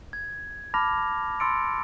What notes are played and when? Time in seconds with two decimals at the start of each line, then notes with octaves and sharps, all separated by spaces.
0.13 G#6
0.74 A5 B5 D6 F6 A#6 F7
1.40 B5 C6 E6 A6 C#7 D7